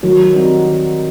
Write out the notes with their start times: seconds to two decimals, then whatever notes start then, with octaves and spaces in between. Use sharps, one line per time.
0.03 D#3 F#3
0.34 G3 C4 D#4 F#4
0.65 D#3